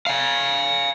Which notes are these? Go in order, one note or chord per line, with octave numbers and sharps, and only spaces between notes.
F5 G#5